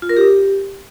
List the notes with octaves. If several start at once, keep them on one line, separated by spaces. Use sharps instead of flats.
F4
A#4
G4